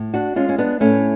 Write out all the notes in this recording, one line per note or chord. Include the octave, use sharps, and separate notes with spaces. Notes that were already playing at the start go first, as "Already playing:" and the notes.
Already playing: A2
D4 F#4
G#3 C#4 F4
C#4
B3 D4
A2 A3 C#4